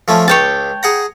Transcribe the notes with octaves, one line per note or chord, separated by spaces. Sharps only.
F3 A3 C#4
C#2 C#5 G5 A5
G#4 F#5 A#5